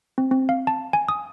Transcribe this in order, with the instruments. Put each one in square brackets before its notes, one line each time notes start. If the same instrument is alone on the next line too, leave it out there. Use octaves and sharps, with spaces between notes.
[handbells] C4
C4
F5
A5
G#5
D#6